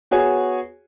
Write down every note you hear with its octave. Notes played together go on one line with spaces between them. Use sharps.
B3 F#4 G#4 C#5 G#5